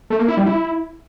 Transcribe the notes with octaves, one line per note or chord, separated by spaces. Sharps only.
A3
A#3
E4
G3
E4